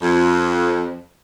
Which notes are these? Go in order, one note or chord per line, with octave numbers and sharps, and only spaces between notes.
F2